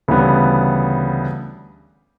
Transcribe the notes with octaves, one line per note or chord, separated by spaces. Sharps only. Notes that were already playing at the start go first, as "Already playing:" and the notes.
D2 C#3 E3 G3 B3